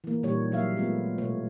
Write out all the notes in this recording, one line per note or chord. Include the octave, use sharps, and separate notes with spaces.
E3 A#3
A#2 D#3 G3 A#3 C#5
F#3 A#3 E5 F5
G#3 A3 B3 F4
B2 A3 C#5